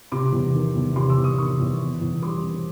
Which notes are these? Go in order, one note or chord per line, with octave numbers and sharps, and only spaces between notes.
C3 C6 D6
E2
D#3
E2
C3 C6 D6
D6 E6
E2
C#6 D#6
D#3 C#6 D#6
E2
B2
E2
G3 C6 D6
C4